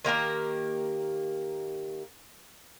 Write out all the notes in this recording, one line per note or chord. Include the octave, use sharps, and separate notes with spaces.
D#3 A#3 G4 A#4